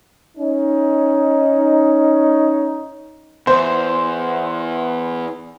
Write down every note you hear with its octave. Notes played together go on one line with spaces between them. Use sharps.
C#4 D#4
E2 C5